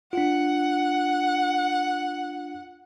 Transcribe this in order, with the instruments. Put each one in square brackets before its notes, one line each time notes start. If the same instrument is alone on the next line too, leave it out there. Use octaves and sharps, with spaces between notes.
[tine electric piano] D4 F4 [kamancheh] F#5